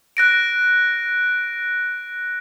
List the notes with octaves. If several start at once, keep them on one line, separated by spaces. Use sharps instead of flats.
F#6 A#6 D7